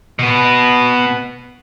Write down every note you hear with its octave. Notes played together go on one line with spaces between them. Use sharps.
B2 B3